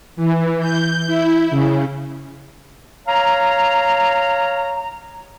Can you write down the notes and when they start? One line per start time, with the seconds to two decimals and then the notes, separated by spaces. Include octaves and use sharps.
0.17 E3
0.60 G6
1.07 E4
1.51 C#3
3.08 C#5 F5 A#5